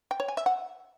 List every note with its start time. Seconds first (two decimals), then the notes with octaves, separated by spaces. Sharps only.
0.11 G5
0.20 C#5
0.28 G#5
0.37 E5
0.46 F#5